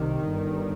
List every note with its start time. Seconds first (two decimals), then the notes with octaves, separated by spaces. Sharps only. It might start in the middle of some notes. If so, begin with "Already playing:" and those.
Already playing: C2 C3 D#3
0.26 G1 G2